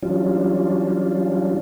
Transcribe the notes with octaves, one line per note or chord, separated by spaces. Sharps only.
E3 F#3 G3 C#4 D4 F4